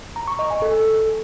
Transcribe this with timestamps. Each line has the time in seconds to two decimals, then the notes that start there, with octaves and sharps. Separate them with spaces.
0.16 A#5
0.28 C#6
0.39 D#5
0.50 G#5
0.62 A4